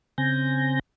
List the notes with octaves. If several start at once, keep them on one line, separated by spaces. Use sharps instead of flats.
C#3 C4 G#5 G6 A#6